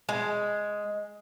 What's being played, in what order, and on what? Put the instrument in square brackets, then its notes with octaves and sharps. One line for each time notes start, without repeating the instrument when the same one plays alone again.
[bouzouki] G#3